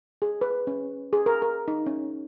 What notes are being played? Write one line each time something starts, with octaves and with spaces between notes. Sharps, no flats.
G#4
B4
C#4
G#4
A#4
A#4
D#4
C#4